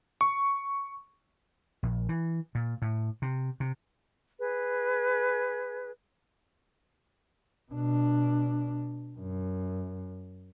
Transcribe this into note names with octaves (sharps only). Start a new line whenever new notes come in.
C#6
A#1
E3
A#2
A2
C3
C3
G#4 B4
B2 D4
F#2